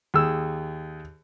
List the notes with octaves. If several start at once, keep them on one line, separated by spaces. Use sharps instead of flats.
D#2 G#4 E6